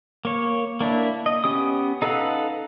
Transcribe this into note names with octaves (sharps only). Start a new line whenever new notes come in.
A#3 C#5
A#3 D4 E4
D#5
B3 C#4 G4 D#6
D#4 A4 B4 F5 F#5